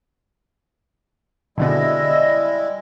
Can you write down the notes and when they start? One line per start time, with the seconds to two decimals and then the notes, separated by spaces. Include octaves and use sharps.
1.58 B2 D3 G3 G#3 B3 E4 D#5 E6